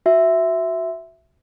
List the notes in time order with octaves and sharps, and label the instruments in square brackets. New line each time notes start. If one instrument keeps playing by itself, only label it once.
[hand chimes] F#4 E5